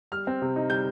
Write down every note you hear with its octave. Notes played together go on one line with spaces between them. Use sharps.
G3 F6
C4
C3
D#4
G3 G6